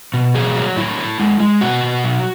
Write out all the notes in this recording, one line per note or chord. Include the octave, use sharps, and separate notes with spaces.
B2
F#3 G#4
F#3
A2 E4
A2
G#3
G#3
B2 F#4
B2
F#3